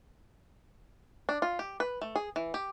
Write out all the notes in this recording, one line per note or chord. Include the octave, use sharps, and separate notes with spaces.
D4
F4
G4
B4
A3
G#4
E3
G4